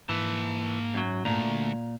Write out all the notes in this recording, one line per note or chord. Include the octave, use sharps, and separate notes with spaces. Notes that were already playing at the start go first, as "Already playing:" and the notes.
G#2 E3 A#3 A5
F#2 F#3
D2 A#2 A3 A#5